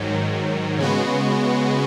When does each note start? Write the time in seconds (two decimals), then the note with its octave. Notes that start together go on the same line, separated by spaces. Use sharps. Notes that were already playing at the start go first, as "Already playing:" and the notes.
Already playing: G#2 D#3 F#3
0.79 C#3 G#3 B3 F#4